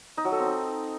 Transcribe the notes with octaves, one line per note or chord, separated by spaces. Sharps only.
D#4
F#3
A4
C4
D#4